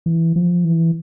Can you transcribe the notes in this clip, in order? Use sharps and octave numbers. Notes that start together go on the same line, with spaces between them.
E3
F3
E3